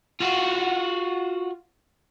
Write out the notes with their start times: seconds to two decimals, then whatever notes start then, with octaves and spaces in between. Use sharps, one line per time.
0.20 F4 F#4